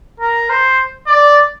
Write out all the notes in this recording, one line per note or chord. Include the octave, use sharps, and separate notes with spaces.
A#4
C5
D5